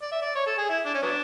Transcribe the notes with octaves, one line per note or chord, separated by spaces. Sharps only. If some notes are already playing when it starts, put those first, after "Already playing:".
D5
E5
D5
C#5
A4
G#4
E4
D4
C#4
F#3 B3 D4